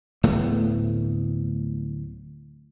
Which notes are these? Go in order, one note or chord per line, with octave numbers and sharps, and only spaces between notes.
D1 A2 A3 B3